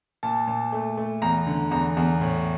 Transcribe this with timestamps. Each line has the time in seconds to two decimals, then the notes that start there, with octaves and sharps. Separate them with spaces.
0.23 A#2 A5
0.47 A#2
0.72 A3
0.97 A3
1.22 E2 A#5
1.47 D3
1.71 E2 A#5
1.97 E2
2.21 A2